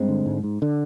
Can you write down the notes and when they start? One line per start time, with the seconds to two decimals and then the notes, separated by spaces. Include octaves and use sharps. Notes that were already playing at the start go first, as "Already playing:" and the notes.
Already playing: G2 G#3 C4
0.08 D3
0.26 G#2
0.44 G#2
0.62 D3